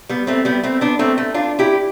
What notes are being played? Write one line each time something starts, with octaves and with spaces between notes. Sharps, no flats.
G3 B3
A3 C4
G3 B3
A3 C4
B3 D4
A3 C4
A3
D4 F4
E4 G4